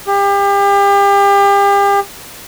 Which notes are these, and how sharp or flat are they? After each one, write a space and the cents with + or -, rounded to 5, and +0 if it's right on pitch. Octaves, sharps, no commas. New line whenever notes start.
G4 +35